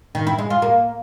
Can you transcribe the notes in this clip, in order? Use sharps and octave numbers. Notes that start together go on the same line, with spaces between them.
D#3
E4
G#3
F4
A#3